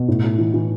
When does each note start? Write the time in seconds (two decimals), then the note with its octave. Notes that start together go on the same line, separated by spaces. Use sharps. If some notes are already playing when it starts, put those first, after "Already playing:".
Already playing: B2
0.08 A2
0.24 A2
0.38 E3
0.54 E3